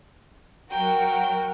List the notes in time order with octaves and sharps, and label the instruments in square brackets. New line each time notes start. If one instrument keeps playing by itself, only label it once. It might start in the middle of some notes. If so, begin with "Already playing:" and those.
[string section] F#3 F#4 A#4 [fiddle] G5